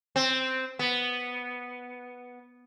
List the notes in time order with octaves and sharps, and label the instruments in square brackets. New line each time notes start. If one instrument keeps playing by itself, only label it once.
[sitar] C4
B3